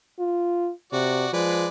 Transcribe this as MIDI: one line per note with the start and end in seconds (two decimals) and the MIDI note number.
0.19 0.70 65
0.93 1.25 48
0.93 1.32 66
0.93 1.32 74
1.33 1.67 53
1.33 1.69 56
1.33 1.69 71
1.33 1.69 74